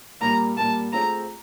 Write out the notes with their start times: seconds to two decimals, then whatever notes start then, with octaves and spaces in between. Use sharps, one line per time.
0.21 A#2 G3 A#3 A#5
0.57 A#2 G3 A#3 A5
0.93 A3 C4 F4 G#4 A#5